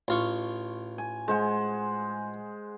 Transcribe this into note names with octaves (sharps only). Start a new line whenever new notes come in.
A1 F4 C#6
G#5
G#3 C5 F#5